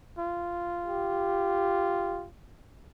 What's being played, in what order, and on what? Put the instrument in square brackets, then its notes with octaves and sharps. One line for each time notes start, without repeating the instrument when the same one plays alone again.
[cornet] F4
[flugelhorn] G4